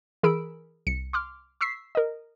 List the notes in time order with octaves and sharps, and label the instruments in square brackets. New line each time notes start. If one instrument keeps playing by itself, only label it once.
[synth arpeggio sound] E3 G#4 A#4 B5 E6 D7
C2 C#7
C6 D6 F6
C#6 E6 B6 C7
A#4 D#5